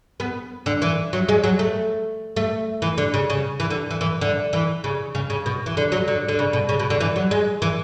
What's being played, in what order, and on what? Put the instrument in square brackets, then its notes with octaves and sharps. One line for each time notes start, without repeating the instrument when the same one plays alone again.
[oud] B3
D3
E3
F#3
G#3
F#3
A3
A3
E3
D3
C#3
C#3
E3
D3
E3
E3
D3
E3
C#3
C#3
C#3
B2
E3
D3
F#3
D3
D3
C#3
B2
C#3
B2
D3
E3
F#3
G#3
E3